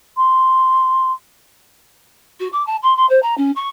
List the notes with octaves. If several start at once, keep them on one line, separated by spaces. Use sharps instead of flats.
C6
F#4
D6
A5
C6
C6
C5
A#5
C#4
C#6